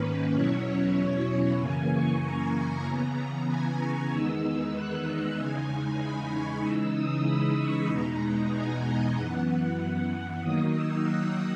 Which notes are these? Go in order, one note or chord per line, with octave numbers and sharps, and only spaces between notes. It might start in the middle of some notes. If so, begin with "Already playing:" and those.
Already playing: G#2 D#3 A#3 C#4 B4
E2 B2 F#3 C#4 E4 C#5
F#2 C#3 E3 A#3 G#5
C#6
A#5
A#5
C#3 E3 B3
G#5
C#6
E2 D#3 G#3 B3 D#4 E6
F#6
E2 C#3 G#3 D#4 G#5
B5
C#6
C#3 E3 G#3 D#4 E6
D#6
B5
C#6
E2 B2 G#3 B3 D#4 A#5
G#5
D#5
F#2 E3 B3 F#5
D#3 F#3 A#3 D#4 D#6
E6
F#6